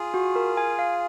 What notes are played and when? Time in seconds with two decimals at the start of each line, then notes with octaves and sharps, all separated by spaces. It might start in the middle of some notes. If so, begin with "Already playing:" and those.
Already playing: F4 G#4
0.14 F#4
0.36 A#4
0.57 G#5
0.79 F5